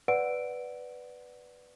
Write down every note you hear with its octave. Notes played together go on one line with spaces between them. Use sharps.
B4 D5 F#5 D7